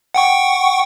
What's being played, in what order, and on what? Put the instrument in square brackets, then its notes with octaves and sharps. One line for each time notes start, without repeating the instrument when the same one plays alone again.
[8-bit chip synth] F#5 G5 C#6